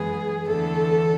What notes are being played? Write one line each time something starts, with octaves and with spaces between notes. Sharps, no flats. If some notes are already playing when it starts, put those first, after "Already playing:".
Already playing: F#2 E3 G#3 B3 G#4
E2 D3 A3 A4